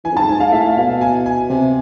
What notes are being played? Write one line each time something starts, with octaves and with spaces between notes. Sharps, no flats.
E3 G#5
F2
G#2 A5
G#2 G#5
G#2 F5
A2 E5
B2 F5
G#5
G#5
C3